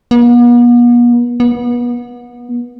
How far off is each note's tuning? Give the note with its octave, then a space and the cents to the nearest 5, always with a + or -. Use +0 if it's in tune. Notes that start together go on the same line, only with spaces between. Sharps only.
B3 -45
B3 -30